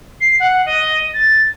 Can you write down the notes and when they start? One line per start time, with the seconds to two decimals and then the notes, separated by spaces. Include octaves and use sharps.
0.20 C7
0.39 F#5
0.65 D#5
1.14 A6